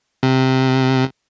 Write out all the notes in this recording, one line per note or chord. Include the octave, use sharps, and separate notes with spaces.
C3